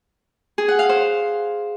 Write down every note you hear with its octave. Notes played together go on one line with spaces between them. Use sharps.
G#4
F#5
F5
C5